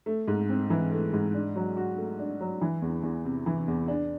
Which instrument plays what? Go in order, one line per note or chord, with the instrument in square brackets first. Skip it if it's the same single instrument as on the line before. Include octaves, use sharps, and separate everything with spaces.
[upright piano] A3
G#2
C4
E3
A3
G#2
D4
F#3
F#4
A3
D4
F#3
E3
E2
E2
C3
E3
E2
D4